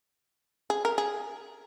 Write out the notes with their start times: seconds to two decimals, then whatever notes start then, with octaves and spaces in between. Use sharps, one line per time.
0.70 G#4
0.85 A#4
0.98 G#4